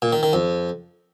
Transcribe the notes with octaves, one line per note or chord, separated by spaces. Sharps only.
A#2
D#3
D#3
F2